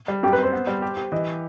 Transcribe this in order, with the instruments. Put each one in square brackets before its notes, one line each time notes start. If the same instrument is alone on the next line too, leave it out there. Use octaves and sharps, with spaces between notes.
[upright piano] G3
[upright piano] F#2 [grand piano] G4
[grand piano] B4
[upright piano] C4
[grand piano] C5
[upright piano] B3
G3
G4
G4
[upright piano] E3 [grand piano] D#5